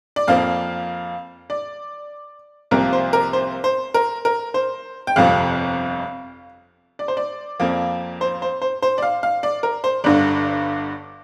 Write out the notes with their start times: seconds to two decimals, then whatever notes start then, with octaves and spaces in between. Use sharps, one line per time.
0.16 D5
0.27 F2 F3 A#3 F5
1.50 D5
2.71 C2 C3 F3 A#3 A#4
2.93 C5
3.13 A#4
3.33 C5
3.64 C5
3.94 A#4
4.25 A#4
4.54 C5
5.07 G5
5.16 G1 F2 C3 F3 F5
6.99 D5
7.08 C5
7.17 D5
7.60 F2 F3 A#3
8.21 C5
8.42 C5
8.62 C5
8.82 C5
8.98 D5
9.02 F5
9.23 F5
9.43 D5
9.63 A#4
9.84 C5
10.04 G1 G2 D3 D5